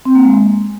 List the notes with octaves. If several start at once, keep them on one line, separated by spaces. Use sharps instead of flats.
C4
A#3
G#3